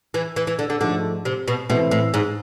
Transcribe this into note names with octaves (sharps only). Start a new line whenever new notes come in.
E3
E3
E3
D3
D3
G#2 D3 F3 A3
C3
B2
B2 E3 A3 C4 E4 B4
A2
G#2